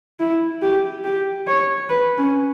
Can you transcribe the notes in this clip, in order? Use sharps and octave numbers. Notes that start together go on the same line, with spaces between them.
E4
G4
G4
C#5
B4
C#4